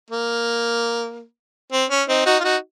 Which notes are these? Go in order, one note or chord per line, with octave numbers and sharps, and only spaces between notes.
A#3
C4
C#4
C4 D#4
D#4 F#4
F4
D#4 F#4